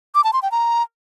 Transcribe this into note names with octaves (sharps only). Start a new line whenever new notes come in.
D6
A5
C6
G5
A#5